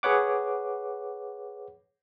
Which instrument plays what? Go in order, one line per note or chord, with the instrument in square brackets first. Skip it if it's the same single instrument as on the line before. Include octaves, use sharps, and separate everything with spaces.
[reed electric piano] G#4 B4 C#5 F#5 D6